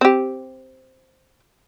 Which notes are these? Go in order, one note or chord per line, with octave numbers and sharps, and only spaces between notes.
C4 G4